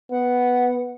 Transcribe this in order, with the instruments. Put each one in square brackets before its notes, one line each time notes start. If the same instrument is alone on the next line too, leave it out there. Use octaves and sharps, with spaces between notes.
[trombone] B3 [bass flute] F#5